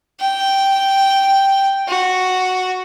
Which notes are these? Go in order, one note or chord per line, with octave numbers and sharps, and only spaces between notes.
G5
F#4